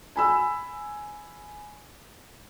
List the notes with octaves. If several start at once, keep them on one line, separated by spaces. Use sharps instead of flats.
G#5 B5 E6